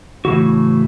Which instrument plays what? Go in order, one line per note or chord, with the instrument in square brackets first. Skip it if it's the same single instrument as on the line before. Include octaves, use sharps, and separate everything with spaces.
[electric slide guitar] A2 C#3 E3 F#4